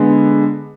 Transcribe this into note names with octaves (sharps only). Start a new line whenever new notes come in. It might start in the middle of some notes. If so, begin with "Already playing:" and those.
Already playing: D3 G#3 B3